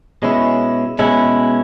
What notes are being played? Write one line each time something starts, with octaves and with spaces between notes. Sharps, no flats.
B2 G#3 C#4 E4
B2 G#3 C#4 E4